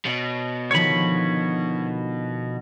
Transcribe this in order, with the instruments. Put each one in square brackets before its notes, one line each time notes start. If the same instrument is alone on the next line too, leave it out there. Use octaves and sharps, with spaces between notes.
[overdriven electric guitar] B2 [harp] C#5 B5
[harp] D3 D#3 F3 [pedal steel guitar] C#5 B5